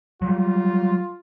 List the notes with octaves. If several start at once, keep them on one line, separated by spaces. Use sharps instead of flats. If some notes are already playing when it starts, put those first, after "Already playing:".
F#3 G3 F4